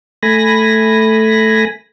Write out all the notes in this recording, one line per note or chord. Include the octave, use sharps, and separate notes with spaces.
A3 G#5 B5 A#6